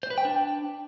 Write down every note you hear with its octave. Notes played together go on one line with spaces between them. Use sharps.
C5
B4
G5
D4